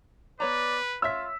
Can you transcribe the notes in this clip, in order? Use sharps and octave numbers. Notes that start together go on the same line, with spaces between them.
B3 B4 C#5 D5 A#5
F4 C#5 E5 E6 B6